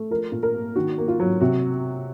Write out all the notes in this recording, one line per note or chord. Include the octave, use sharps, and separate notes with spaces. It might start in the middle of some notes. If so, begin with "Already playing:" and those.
Already playing: A3
F3 A#4
A#2
A#4
A#3
D#3 F#4
A#3
F4
F#3
C3 F#4